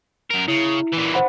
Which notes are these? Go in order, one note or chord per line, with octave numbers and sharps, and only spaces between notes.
F#2 A#4
C#3 E4
A#2 E3
C5 F#5 B5